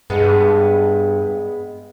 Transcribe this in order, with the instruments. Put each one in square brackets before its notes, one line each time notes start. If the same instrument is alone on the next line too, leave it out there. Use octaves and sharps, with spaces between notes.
[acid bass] G2 [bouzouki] G#3 B3